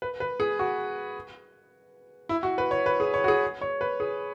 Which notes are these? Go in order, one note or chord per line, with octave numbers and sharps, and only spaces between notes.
B4
B4
G#4
F#4
E4
F#4
B4
C#5
B4
G#4
C#5
F#4
G#4
C#5
B4
G#4